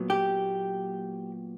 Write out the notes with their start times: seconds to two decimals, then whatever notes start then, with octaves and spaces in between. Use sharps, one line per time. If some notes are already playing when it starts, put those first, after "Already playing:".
Already playing: A#2 F#3 B3
0.10 G4